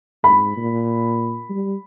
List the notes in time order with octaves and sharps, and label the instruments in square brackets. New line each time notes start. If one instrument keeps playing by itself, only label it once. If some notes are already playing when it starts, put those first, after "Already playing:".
[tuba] G#2 [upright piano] B5
[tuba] A#2
G3